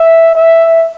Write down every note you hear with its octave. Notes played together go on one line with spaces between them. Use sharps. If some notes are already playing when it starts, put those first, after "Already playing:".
Already playing: E5
E5